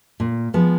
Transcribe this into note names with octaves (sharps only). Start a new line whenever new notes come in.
A#2
F3 G#3 B3